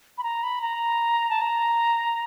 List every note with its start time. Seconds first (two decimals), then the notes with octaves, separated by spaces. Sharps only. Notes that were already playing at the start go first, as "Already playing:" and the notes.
0.18 B5
0.24 A#5
0.43 B5
0.62 A#5
1.30 A5
1.42 A#5